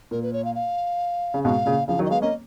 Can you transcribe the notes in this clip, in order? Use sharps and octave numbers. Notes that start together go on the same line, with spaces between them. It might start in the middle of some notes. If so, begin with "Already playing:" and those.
A#2 A#4
B4
C#5
F5
F5
C#3
G#2 B2 F5
A#2 C#3
C#3 F3 F5
D#3 F#3
D#5
G#3 B3 F5
A#3 C#4 D#5